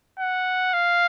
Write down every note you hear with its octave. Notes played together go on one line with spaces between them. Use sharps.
F#5
F5